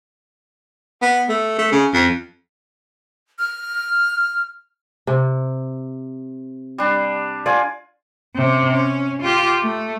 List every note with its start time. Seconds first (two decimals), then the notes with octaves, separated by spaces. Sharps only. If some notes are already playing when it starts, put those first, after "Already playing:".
1.02 B3
1.29 A3
1.58 A3
1.72 C#3
1.94 F2
3.39 F6
5.07 C3
6.78 G3 D4
7.46 F4 D5 G#5
8.35 C3 C#4
8.70 C#4
9.23 F4 G4
9.62 A3